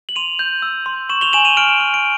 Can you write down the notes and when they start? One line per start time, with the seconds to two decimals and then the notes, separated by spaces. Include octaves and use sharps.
0.09 F#7
0.16 C6 D#7 F7
0.39 G6
0.62 E6
0.86 C6
1.09 C#6 E7 F#7
1.21 F7 G7
1.33 G#5 E7 F#7
1.45 D#7 F7
1.57 F6 D7 E7
1.80 F6
1.94 D7